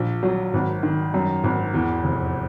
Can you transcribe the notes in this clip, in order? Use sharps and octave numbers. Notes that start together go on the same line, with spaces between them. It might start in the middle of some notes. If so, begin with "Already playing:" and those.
Already playing: A#1
F#3
G#1
D#3
F#2
G#1
E2
F1